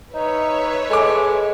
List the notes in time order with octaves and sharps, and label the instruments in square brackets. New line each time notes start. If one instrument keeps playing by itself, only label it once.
[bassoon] D#4 [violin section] B4 C#5 E5
[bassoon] G#3 [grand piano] A4 G#5 D6